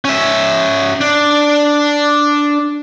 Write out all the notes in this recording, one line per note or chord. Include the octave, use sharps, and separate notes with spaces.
C#4 E5
D4